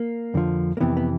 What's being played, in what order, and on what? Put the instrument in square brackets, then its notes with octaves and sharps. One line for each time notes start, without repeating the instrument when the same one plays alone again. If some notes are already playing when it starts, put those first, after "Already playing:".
Already playing: [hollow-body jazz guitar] A#3
F2 D3 F3
A#3
F2 C3 E3 B3
B3